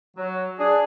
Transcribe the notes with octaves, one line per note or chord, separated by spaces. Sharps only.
F#3
D4 G#4